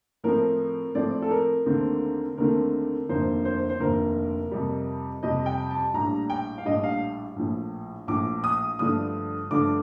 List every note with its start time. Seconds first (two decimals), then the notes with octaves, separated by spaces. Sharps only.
0.24 A2 F3 A3 C4 A#4
0.95 A2 F3 A3 C4 D5
1.22 A4
1.31 A#4
1.66 D#2 D3 A3 C4
2.37 D#2 D3 A3 C4 A#4
3.09 F1 D#2 D3 F3 A#3 C5
3.45 C5
3.70 C5
3.80 F1 D#2 D3 F3 A#3 A#4
4.51 F2 C3 G3
5.23 F2 C3 G3 D#5
5.46 G5
5.70 A5
5.93 A#1 A2 G3 D4 A#5
6.30 G5
6.58 F5
6.65 A#1 A2 G3 D4 D#5
6.83 F5
7.36 A#1 A2 F3
8.07 A#1 A2 F3 D6
8.44 D#6
8.79 G2 D3 F3 A3 D4 D#6
9.51 G2 D3 F3 A3 D4 D6